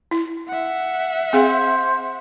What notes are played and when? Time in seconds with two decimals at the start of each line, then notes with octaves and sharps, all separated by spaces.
0.11 E4
0.48 E5 F#5
1.33 C4 G#4 C5 F5